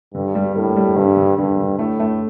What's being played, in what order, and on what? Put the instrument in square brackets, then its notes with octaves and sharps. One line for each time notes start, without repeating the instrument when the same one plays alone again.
[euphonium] G2 [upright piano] D3
[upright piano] G3
[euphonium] A2 [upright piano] A#3
[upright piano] G3
[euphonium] G2 [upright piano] D3
[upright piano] D3
[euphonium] G2 [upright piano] D3
[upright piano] D3
[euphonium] A2 [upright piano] A3
[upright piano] A3